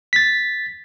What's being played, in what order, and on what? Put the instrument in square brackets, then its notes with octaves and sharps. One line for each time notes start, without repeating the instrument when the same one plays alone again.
[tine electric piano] A6 B6